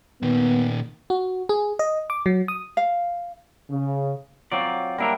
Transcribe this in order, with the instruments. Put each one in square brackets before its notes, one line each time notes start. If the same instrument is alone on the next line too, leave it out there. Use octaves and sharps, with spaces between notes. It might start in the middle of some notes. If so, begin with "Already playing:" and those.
[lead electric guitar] A#2 D#3 [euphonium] B3
[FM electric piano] F#4
G#4
D#5
D6
F#3
D#6
[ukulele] F5
[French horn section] C#3
[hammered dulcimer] F#3 [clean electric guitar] C4 F4 D5
[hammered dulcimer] G3 E5 [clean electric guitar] A#3 D4 A#4